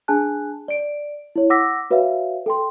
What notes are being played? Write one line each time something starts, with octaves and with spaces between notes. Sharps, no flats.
D4 G#4 G#5 A5 F#6
D5 D7
E4 C#5
F#5 D6 E6 A#6 B6
F#4 B4 C#5 E5 F5
A4 G5 C6